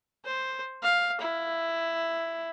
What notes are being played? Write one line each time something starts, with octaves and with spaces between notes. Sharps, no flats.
C5
F5
E4